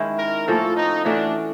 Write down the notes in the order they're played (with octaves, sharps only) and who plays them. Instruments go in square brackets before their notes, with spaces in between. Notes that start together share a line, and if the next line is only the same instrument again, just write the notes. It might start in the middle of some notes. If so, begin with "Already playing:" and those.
Already playing: [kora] D#3 G#3 C#4 E4
[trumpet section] A#4
[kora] A2 F3 A#3 C#4 [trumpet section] A4
[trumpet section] D#4
[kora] E3 A3 C#4 F#4 [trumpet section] D4